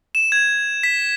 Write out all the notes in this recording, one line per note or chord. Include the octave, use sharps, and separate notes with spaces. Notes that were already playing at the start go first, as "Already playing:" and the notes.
E7
G#6
B6